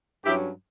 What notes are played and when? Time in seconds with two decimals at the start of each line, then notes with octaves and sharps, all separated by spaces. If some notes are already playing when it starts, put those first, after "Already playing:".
0.25 G2 F#3 C#4 E4 G4